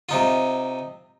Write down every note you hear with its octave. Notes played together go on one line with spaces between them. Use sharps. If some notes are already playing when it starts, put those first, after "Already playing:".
C3 D#4 F4